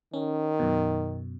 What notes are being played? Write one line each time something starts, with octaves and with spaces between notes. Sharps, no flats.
D#3 C#4
F#2 B2